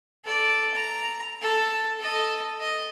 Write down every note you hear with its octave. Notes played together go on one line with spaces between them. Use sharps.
A4 D5
A#5
A4
A4 D#5
D#5